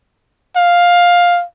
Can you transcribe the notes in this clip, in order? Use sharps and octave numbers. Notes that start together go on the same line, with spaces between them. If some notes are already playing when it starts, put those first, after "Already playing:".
F5